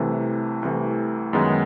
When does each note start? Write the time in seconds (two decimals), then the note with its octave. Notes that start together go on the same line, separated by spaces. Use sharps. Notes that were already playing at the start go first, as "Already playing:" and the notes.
Already playing: C2 C3 E3 A3
0.63 C2 C3 E3 A3
1.33 F#2 D#3 G#3 B3 D#4